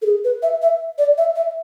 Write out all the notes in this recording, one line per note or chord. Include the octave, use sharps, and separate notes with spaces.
A4
G#4
B4
E5
E5
D5
E5
E5